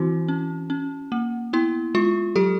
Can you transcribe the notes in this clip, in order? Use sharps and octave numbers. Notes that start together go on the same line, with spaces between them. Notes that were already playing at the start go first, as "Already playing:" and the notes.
Already playing: E3 C4 E4 F#4
C#4
C#4
A#3
B3 E4
G#3 F4
F#3 G4 A4